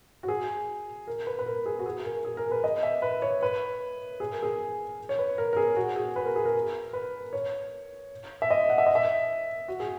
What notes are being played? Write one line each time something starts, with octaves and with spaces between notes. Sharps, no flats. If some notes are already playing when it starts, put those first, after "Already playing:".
F#4
G#4
A#4
B4
B4
A#4
G#4
F#4
G#4
A#4
G#4
A#4
B4
D#5
E5
B4
C#5
B4
G#4
A#4
G#4
C#5
B4
A#4
A#4
G#4
F#4
G#4
B4
A#4
G#4
A#4
B4
C#5
E5
D#5
F#5
E5
D#5
E5
F#4
G#4